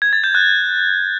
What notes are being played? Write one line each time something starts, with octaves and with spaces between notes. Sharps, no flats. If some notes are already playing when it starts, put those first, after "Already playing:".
G#6
A6
G6
F#6